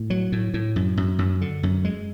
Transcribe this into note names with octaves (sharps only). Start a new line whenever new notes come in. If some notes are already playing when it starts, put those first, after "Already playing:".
Already playing: A2
F#3
A2
A2
F#2
F#2
F#2
D3
F#2
G#3